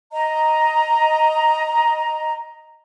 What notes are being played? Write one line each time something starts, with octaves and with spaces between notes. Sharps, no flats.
D#5 A#5